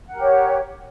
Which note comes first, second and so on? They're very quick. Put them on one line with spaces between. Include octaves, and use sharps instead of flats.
F#5 A#4 G4 C#5